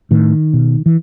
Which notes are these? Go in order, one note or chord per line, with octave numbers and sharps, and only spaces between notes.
A2 D#3
B2
E3